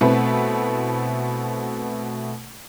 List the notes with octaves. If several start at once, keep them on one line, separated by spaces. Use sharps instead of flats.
B2 A3 C4 E4 B4